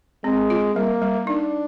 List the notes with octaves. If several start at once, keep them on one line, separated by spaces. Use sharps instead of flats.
G#3 C4
F4
G3 A#3
G3
D4 D#4